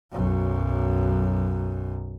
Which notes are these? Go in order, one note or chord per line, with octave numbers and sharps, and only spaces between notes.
B1 F#2